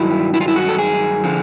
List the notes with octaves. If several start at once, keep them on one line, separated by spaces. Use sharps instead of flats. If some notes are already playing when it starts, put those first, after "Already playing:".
Already playing: G2 D#3 F#3 E4
E4
F4
E4
F#4
A4
G#4
D3 F3